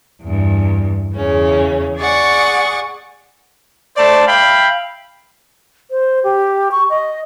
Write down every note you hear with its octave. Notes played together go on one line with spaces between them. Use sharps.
E2 G2
E2 C#3 C#4
G#4 D5 F#5 C#6
A3 C5 D5 A5
E5 F5 G5 B5
C5
G4
C#6
D#5